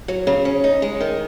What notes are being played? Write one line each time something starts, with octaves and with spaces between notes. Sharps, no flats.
F#3
C#3
C#4
D#4
G#3
D#3